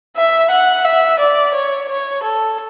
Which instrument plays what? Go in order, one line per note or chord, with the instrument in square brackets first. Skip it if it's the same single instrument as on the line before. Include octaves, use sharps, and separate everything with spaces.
[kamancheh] E5
F#5
E5
D5
C#5
C#5
A4